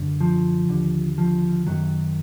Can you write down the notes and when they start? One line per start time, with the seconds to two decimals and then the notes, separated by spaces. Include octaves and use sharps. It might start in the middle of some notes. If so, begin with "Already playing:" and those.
Already playing: F#2 D3
0.21 F3
0.69 D#2 D3
1.18 F3
1.67 F#2 D#3 F#3